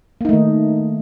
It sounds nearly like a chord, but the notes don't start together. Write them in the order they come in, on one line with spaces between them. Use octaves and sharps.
A#3 D#4 A3 D#3